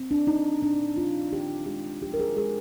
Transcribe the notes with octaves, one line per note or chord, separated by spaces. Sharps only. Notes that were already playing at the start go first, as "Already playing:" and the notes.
Already playing: C4
D4
D#3 D#4
A#2 D4
F3 F4
D#3 G4
G#3 G4
F3 G4
A#4
G#4
G#3 G#4